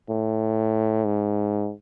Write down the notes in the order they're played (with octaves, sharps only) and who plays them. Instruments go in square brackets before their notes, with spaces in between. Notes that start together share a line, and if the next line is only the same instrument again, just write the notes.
[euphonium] A2
G#2